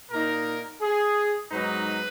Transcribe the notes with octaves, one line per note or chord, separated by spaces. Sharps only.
A#2 A#3 D#4 A#4
G#4
G#2 F#3 B3 D#4 B4